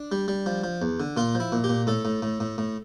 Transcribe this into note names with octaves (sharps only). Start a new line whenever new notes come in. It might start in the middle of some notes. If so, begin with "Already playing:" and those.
Already playing: D4
G3
G3
F3
F3
E2
D3
A#2 F4
F3
E4
A#2
G4
A#2
A2 A4
A2
A2
A2
A2